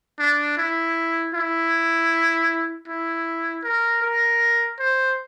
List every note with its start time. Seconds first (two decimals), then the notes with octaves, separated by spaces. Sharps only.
0.19 D4
0.58 E4
1.34 E4
2.88 E4
3.64 A#4
4.02 A#4
4.79 C5